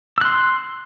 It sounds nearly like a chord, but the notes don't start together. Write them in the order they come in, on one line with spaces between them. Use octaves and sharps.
E6 F#6 C6